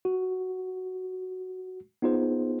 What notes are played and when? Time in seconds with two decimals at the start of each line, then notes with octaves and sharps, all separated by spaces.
0.05 F#4
2.02 B3 D#4 F4 G#4 C5